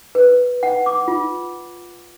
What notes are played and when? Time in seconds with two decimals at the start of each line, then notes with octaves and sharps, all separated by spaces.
0.15 B4
0.63 F#5
0.86 D6
1.08 F4